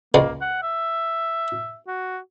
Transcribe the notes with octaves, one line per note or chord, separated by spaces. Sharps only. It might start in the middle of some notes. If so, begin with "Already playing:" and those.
C#2 G#3 A#3
F#5
E5
F#4